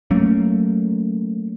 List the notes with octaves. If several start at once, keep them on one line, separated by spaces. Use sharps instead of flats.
F#3 A3 A#3 C#4